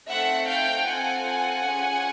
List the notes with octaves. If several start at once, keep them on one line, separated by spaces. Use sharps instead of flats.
A3 C4 D#4 E5 F#5
F5 G5
C4 F4 A4 F#5 G#5
C#4 F4 G#4